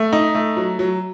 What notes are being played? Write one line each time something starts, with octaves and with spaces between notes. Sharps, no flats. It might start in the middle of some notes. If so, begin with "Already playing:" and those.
Already playing: A3
D#4
A3
F#3
F#3